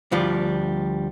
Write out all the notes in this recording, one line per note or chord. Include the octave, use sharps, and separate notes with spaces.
D2 F3 G3